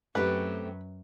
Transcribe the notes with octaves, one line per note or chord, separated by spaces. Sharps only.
F#2 A3 C4 G4 B4